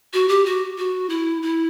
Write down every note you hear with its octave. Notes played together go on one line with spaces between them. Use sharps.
F#4
G4
F#4
F#4
E4
E4